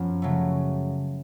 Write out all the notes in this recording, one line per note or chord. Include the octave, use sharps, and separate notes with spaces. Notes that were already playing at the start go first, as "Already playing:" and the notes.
Already playing: F#2 F3 B3 F4
C#3 F#3 A3